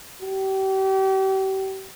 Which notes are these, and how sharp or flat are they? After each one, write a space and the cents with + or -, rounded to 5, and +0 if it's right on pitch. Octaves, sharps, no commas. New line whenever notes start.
G4 -35